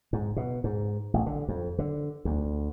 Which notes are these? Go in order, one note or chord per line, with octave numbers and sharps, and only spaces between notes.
G#2
B2
G#2
A1
D3
F2
D3
D2